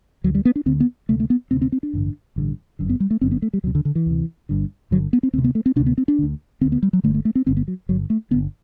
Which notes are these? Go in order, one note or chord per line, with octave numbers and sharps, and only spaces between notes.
D2 D3 F#3
G3
B3
D4
D2 D3 C4
B3
D2 C3 A3
A3
B3
D2 C3 C4
C4
C4
D4
A1 G2 D3
A1 G2 D3
G1 F#2 D3
B3
G3
A3
G1 F#2 D3 C4
B3
A3
G3
D2 C3 F#3
D3
D3
E3
D2 C3
G1 G2 D3
G1 G2 D3 F#3
B3
C4
D2 C3 C4
B3
A3
C4
D2 C3 D4
B3
C4
D4
D2 D3
D2 D3 C4
B3
G3
F#3
G1 G2 D3 A3
A3
A3
C4
G1 G2 D3 C4
B3
F#3
G1 G2 D3 F#3
A3
G1 G2 D3 B3